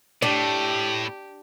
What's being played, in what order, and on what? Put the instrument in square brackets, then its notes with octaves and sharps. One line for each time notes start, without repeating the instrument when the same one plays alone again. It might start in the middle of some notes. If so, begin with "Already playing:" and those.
[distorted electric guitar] A2 [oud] D4 [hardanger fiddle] G4